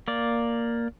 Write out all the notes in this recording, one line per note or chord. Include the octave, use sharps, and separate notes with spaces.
A#3 D5